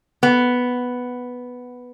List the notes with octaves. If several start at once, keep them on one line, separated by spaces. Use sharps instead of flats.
B3